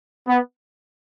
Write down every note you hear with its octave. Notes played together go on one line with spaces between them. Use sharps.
B3